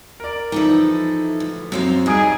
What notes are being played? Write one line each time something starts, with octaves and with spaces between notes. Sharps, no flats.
A#4 D5
E3 F3 D#4 E4 A4
D2
F#2 F#3 A#3 C4 F5
D#1 G3 D#4 G#4 D#6 D7